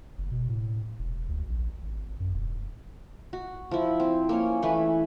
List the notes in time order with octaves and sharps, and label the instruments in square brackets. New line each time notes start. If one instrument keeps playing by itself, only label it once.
[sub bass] F#1
B2
A2
E1
D2
A#1
G#1
F#2
E1
[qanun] F#4
F3 E4
C4
A#3 C#4 C#5
E3 A3 B4 G#5